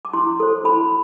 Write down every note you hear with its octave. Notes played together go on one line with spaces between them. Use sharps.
D6
E4 C6
A4 C5
E4 B5